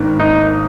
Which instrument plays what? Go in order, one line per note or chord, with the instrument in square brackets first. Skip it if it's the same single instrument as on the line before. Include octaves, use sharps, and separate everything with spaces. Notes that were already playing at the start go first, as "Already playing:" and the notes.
Already playing: [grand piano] G#1 G#2 D#3 A#3 D4
[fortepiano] D#4